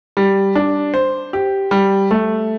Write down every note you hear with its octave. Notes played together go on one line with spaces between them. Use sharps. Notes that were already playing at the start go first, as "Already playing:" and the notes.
G3
D4
C5
G4
G3
A3